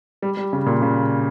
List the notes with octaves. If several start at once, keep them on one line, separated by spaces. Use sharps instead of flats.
G3
G3
C#3
A#2
C#3